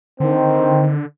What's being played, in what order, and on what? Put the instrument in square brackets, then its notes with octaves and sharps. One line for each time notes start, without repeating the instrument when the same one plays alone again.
[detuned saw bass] D3 [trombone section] D#3 C4